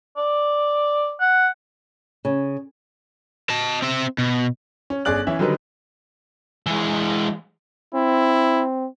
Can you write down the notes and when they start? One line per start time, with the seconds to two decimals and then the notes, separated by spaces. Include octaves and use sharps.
0.17 D5
1.21 F#5
2.25 C#3
3.50 D#5 A5
3.82 C4 E5
4.18 B2
4.90 C#4
5.05 G1 C#4 G#4 D5 F#6 F#7
5.27 E3 C#4 E5
5.39 D3 D#3 F#3 G3 D#4 B4
6.66 E3 G#3
7.94 C4 E4